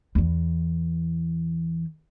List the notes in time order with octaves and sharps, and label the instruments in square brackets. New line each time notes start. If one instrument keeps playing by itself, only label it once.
[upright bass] E2 E3